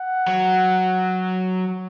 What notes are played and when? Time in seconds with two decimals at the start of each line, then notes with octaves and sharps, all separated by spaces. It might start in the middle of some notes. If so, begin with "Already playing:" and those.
Already playing: F#5
0.27 F#3